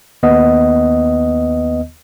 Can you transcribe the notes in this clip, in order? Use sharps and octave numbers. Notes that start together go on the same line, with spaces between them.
D#2 B3 D#5